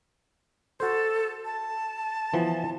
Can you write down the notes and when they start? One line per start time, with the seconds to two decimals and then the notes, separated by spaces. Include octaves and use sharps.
0.80 F#4 A4 C5
1.45 A5
2.34 E3 F3 B3